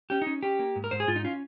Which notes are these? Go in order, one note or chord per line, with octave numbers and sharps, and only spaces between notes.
C#4 G4
D#4
C#4
C#4 G4
A#3
G#2
A#4
G#2 C5
G#4
G#2 F4
D#4
C#4 F4